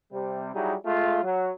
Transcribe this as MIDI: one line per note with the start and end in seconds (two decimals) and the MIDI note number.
0.12 0.51 48
0.12 0.51 55
0.54 0.74 54
0.54 0.74 55
0.54 0.74 63
0.54 0.74 64
0.54 0.74 68
0.85 1.20 56
0.85 1.20 57
0.85 1.20 65
1.23 1.51 54